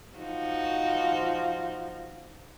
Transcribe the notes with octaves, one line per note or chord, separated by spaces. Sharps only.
F3 D#4 F#4